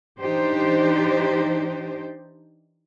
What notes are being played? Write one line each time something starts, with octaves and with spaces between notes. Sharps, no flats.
E3 D4 D#4 G4 C5